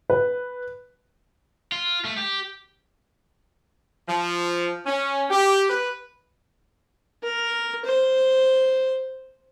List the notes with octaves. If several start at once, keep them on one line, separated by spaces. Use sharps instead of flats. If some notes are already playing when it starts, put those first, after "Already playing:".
B4
F4
A3
G4
F3
C#4
G4
B4
A#4
C5